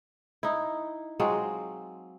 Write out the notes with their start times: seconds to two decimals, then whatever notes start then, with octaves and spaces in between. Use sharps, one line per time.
0.43 D#4 E4
1.20 F#3 G#3 C4 F4